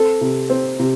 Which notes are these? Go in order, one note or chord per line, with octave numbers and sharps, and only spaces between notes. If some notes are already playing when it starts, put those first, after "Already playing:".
Already playing: C4 A4
C3
C4
C3